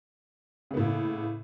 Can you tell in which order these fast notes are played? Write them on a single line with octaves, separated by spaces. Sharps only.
C#3 B3 A2 A#3